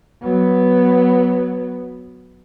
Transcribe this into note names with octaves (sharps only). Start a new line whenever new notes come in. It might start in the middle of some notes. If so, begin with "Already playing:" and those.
F#3 B3